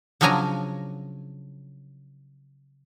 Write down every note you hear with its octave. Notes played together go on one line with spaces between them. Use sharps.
C#3 F3 F#3 D4 G#5 A#5